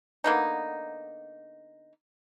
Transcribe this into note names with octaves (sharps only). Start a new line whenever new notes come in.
D3 A#3 B3 D#4